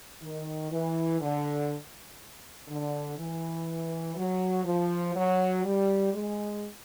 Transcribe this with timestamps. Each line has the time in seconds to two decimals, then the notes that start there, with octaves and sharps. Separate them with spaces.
0.22 D#3
0.71 E3
1.21 D3
2.68 D3
3.17 E3
4.16 F#3
4.65 F3
5.14 F#3
5.65 G3
6.14 G#3